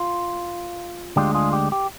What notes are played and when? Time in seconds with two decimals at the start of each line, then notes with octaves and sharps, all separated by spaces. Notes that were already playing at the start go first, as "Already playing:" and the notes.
Already playing: F4
1.16 D2 D3 G#3 D4 F4 G4
1.34 F4 G#4
1.53 G4
1.72 G4